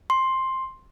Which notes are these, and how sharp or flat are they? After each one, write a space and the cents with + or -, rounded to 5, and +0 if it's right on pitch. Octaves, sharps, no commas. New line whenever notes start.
C6 +10